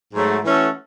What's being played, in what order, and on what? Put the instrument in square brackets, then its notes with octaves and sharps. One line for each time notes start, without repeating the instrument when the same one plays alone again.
[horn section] G#2 F#3 A3
E3 A3 C#4 F#4 A4